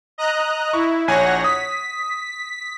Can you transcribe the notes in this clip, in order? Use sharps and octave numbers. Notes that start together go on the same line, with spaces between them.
D#5 A#5 F#6
E4 C#6
A#1 C#5 F#5 G#5 A#6
D#6 B6